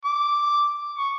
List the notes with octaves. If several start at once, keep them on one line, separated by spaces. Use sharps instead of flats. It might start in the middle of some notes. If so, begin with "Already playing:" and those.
D6
C#6